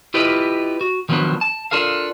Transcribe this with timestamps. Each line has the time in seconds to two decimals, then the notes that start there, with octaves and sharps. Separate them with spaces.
0.14 E4 F4 G4 B4 D#5
0.81 F#4
1.09 D#3 F3 F#3 A#3 B3 D4
1.41 A5
1.71 D4 F4 A4 A#4 F5